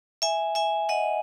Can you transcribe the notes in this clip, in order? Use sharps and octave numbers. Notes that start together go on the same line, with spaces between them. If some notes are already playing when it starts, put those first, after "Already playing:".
E5 G#5
E5 G#5
D#5 F#5